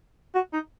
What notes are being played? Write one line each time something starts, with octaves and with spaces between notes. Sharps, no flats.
F#4
D#4